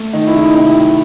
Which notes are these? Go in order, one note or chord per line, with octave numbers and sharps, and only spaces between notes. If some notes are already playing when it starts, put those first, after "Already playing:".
Already playing: A3
D#3 D#4
E4
C#2
D#4
C3 E4
F#3